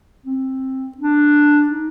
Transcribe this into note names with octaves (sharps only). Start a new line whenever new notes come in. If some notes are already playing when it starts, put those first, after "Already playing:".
C4
D4
D#4